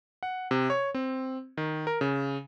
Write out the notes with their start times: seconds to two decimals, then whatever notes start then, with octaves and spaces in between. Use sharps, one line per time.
0.23 F#5
0.51 C3
0.70 C#5
0.94 C4
1.57 D#3
1.87 A#4
2.01 C#3